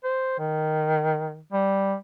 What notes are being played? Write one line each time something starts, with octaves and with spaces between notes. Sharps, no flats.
C5
D#3
G3